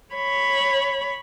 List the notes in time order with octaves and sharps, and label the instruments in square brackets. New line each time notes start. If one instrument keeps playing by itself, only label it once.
[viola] C#5 B5